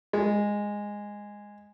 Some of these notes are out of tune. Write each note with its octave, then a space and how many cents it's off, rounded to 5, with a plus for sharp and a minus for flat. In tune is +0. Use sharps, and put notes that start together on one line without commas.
G#3 -10